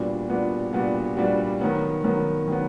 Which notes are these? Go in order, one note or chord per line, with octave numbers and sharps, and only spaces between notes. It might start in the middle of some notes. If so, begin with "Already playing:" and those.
Already playing: A#2 G3 B3 D4 F#4
A#2 G3 B3 D4 F#4
A#2 G3 B3 D4 F#4
A#2 G3 B3 D4 F#4
D#3 F#3 B3
D#3 F#3 B3
D#3 F#3 B3